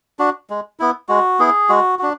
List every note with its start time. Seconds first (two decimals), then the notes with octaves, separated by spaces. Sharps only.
0.19 D4 F#4
0.50 G#3
0.80 B3 E4
1.09 G#3 F#4
1.39 B3 E4 G#4
1.69 G#3 F#4
1.99 D4 F#4